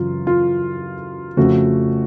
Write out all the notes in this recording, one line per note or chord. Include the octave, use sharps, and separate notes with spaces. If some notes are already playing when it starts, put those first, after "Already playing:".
Already playing: F#2 C#3 E3 F4
F4
F2 C#3 F3 A3 F#4